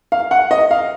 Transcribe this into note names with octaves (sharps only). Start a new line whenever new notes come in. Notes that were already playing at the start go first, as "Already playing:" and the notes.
F5
F#5
D#5
F5